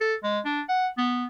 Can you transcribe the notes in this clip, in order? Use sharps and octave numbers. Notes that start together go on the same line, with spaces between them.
A4
G#3
D4
F#5
B3